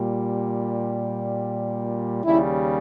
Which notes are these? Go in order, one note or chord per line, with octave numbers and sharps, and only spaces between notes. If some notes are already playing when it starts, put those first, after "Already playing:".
Already playing: A#2 G3
D#2 C#3 G3 E4